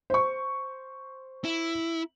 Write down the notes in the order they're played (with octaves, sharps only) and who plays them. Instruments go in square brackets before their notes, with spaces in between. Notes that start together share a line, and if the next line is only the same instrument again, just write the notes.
[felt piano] C5 C#6
[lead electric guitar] E4